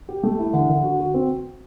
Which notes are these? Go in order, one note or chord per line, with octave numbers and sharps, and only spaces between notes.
G4
A3
E4
D3
D3
F#4
F#4
C4